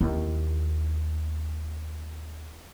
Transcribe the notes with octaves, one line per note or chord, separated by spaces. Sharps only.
D#2 E4